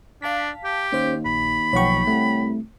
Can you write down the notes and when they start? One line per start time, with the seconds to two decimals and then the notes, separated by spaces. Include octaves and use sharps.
0.22 D4 F5 A5 B6
0.64 G4
0.92 D#2 C#4 C5 F5
1.26 A#1 B5
1.73 B1 F3 C#5 F#5 G5 C#6
2.07 C2 A3